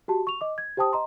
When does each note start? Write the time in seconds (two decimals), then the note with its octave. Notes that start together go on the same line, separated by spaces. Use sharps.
0.08 F#4 G4 A5
0.27 C#6 F7
0.41 D#5 D6
0.58 G#6
0.77 G4 C5 G5 A5 D#6
0.93 D#5 A#5 C6